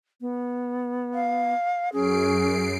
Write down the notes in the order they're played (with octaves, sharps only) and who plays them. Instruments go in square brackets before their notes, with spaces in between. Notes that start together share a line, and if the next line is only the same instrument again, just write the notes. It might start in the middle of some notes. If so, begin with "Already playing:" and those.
[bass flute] B3
[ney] F5
[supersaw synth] F#2 C7 D7 [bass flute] C#4 [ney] G#4